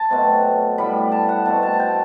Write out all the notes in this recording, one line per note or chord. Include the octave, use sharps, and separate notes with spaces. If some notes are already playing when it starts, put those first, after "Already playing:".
Already playing: A5
B2 F#3 A3 C4
A2 G3 B3 B5
A5
F#5
B2 A3 C4 A5
A5
A5
G5